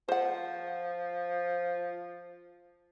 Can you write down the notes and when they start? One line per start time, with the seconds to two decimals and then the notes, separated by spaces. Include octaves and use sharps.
0.09 F3 C5 F#5